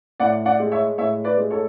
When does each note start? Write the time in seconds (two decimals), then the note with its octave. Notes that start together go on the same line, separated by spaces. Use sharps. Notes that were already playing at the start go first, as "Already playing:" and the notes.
0.20 A2 D5 F#5
0.46 D5 F#5
0.59 G#3
0.72 C#5 E5
0.98 A2 C#5 E5
1.24 B4 D5
1.37 G#3
1.51 A4 C#5